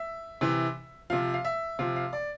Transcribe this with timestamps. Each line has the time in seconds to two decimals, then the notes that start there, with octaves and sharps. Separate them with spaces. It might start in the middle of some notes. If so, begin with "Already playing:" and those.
Already playing: E5
0.41 C3 E3
1.10 C3 F3 F5
1.34 F5
1.45 E5
1.79 C3 F3 F5
1.96 F5
2.13 D5